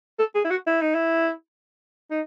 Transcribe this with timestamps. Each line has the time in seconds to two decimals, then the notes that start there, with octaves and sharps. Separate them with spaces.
0.19 A4
0.35 G#4
0.45 E4
0.50 F#4
0.67 E4
0.81 D#4
0.95 E4
2.11 D#4